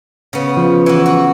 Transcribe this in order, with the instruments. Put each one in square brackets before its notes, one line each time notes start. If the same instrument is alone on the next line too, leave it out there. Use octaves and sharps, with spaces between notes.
[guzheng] C#3 B3
[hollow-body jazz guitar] F3
[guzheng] E3 F#4
F#4